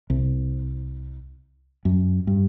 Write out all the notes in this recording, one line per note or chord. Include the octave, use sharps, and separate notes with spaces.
C2
F#2
G2